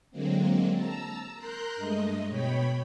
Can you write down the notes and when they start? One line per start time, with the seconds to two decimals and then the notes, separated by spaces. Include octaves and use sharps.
0.11 D3 F#3 G#3 A#3 C4
0.73 A5 A#5 E6
1.35 A#4 A#5 C6 F#6 G6
1.76 G2 G#3 A3 D#5
2.28 B2 C#5 G5 B5